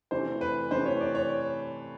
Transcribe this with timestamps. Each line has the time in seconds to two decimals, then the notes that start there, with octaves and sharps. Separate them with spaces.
0.11 C3 E3 A3 D4 C5
0.41 B4
0.70 C3 E3 A3 D4 C5
0.86 C#5
1.00 D5
1.15 C#5